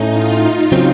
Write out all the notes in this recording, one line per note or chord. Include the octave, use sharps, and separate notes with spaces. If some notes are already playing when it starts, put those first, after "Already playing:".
Already playing: A2 A3 C#4 D#4
F4
C#3 F#3 C4